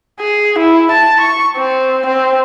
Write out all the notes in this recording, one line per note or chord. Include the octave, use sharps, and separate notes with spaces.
G#4
E4
A5
C#6
C4
C4